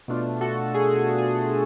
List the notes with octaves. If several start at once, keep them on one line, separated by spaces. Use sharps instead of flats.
B2 A3 D4 F4
F#4 A4
G#4
G#4
G#4